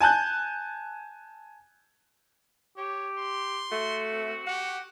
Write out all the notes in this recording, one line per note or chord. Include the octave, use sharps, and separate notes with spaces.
G#5 A5 F#6 G6
G4 C#5
C6
A3 F#4
C4
G4 F#5